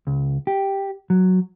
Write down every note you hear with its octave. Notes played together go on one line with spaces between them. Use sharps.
C#2
G4
F#3